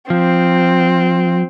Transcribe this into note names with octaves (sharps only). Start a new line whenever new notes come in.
F3 C4